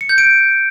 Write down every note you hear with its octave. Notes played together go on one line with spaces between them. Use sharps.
C#7
G6
D7